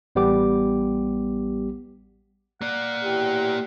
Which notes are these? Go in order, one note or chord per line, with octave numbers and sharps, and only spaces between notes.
A1 G3 B3 G4 D6
A#3 D5 F#5
E2 A2 G4